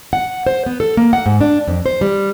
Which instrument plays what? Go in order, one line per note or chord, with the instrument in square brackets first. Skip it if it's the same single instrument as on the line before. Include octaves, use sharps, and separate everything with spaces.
[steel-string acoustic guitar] F#5
C5
B3
A4
A#3
F#5
G#2
D4
F2
C5
G3